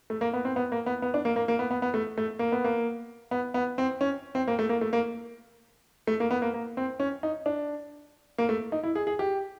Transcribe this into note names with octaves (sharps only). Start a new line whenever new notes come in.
A3
A#3
B3
C4
B3
A#3
B3
B3
D4
A#3
A#3
A#3
B3
B3
B3
A3
A3
A#3
B3
A#3
B3
B3
C4
C#4
C4
A#3
A3
A#3
A3
A#3
A3
A#3
B3
A#3
A#3
C4
C#4
D#4
D4
A#3
A3
D#4
E4
G#4
G#4
G4